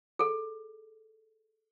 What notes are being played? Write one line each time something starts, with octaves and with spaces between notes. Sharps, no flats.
G#4 A4